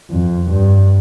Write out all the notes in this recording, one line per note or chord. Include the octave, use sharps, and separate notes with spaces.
F2
G2